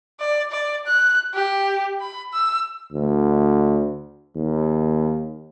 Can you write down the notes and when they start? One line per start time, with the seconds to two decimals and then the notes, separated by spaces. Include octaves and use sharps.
0.20 D5
0.52 D5
0.86 F#6
1.34 G4
2.01 B5
2.33 E6
2.93 D2
4.36 D#2